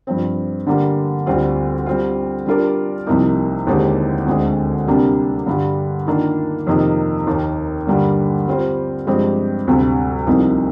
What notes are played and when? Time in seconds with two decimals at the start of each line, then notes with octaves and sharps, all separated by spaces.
0.07 G2 F3 C4
0.67 D3 G3 A#3
1.26 D2 D3 G3 C4 F4
1.86 G3 C4 F4
2.46 G3 D4 F4 A#4 D5
3.07 C2 C3 F3 A#3 D#4
3.67 D#2 D3 G#3 C4 G4
4.26 D2 D3 G#3 C4
4.87 C3 G3 A#3 D4
5.46 G2 D3 G3
6.07 D#3 A#3 D4 F4
6.67 F2 C3 D#3 A#3 D#4
7.27 D#2 D#3 A#3
7.87 G2 D3 G3 A#3
8.47 G3 C4 F4 C5
9.07 G2 F3 G#3 C4 G4
9.67 D2 C3 G3
10.27 C2 C3 F3 A#3 D#4